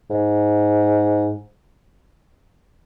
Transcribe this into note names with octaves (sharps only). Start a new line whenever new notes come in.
G#2